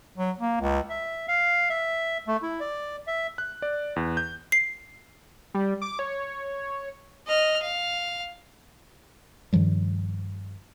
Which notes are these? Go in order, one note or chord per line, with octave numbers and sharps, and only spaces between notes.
F#3
A#3
C#2
E5
F5
E5
A3
E4
D5
E5
F#6
D5
E2
G6
C7
G3
D6
C#5
D#5 F6
F5
G2 D#3 F3 G3